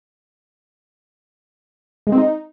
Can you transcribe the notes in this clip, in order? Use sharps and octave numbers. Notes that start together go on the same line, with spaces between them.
G#3
C4
D#4